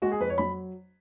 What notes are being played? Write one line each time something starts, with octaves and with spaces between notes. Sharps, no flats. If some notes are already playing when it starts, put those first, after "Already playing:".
G#3 F#4
G#4
F2 B4
C#5
F#3 B5